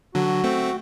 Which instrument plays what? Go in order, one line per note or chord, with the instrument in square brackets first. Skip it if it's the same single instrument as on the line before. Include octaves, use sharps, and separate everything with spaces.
[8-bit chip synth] D3 F#3 [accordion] F#4
[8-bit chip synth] A3 C4